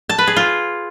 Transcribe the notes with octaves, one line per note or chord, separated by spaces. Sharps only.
A5
B4
G#4
F4